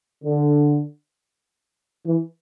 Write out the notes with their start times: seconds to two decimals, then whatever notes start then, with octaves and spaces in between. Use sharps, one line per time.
0.23 D3
2.05 E3